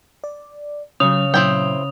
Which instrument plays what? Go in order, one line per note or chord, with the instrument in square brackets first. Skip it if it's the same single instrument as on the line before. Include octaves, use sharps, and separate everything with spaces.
[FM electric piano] D5
[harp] C#3 [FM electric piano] F#3 C#4 [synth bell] D#6 F7
[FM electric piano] A#2 F#3 [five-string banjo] C4 E4 G5